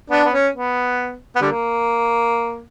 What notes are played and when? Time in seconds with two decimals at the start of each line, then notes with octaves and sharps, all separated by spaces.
0.10 B3 D4
0.25 B3
0.33 C#4
0.54 B3
1.36 B3
1.42 D3 G3 A#3